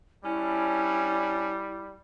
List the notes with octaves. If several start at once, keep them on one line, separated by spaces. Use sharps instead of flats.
G3 C#4 D4 E4